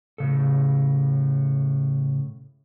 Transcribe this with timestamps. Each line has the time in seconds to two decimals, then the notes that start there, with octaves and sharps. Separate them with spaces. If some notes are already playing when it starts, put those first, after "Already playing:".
0.18 A2 C#3 A4